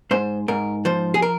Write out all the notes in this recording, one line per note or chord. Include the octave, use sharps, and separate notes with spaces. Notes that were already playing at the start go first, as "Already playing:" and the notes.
G#2 C5
G#2 A#4
F3 C5
G#4
A#4